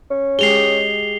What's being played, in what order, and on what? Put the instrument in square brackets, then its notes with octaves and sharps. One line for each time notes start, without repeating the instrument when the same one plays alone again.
[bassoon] C#4
[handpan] G#3 G4 G#4 [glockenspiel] C7 F7 G7